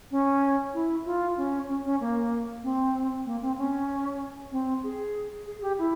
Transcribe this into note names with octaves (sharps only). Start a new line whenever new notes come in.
C#4
E4
F4
C#4
C#4
C#4
A#3
C4
A#3
C4
C#4
C4
G#4
G#4
G4
E4